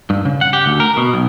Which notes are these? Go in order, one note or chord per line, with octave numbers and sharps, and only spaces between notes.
G2
C#3
F#5
G4
D2
A#4
B2
B1